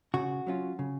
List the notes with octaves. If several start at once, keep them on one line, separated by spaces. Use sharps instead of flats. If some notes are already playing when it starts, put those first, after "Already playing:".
C#3 F#4
F#3 C#4 F4
C#3